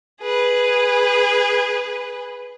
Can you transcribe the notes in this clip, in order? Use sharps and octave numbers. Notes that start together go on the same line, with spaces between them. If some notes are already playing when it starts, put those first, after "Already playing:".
G#4 B4